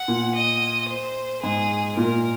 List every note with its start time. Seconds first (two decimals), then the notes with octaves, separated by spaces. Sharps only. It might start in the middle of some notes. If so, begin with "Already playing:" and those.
Already playing: F#5
0.08 A#2
0.35 D#5
0.89 C5
1.43 G#2 G#4
1.97 A#2 A#4